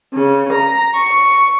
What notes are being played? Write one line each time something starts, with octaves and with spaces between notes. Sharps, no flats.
C#3
A#5
C#6